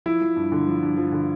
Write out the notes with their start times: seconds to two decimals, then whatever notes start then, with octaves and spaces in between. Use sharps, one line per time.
0.06 F3 E4
0.21 F3
0.36 G2
0.52 D3
0.67 F3
0.83 G2
0.97 F3
1.12 D3